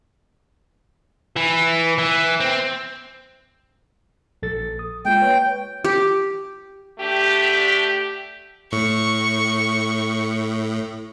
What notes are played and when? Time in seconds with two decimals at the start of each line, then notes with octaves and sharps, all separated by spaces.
1.36 E3
1.98 E3
2.40 C4
4.43 A#1 A4 A6
4.79 D#6
5.05 G#3 A#3 F4 G5
5.22 B4 C#5
5.84 G4
6.99 D3 A3 D4 G4
8.72 A2 C#6